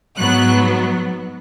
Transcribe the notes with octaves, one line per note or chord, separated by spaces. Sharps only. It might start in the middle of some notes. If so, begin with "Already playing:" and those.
G#2 F#3 B3 F#6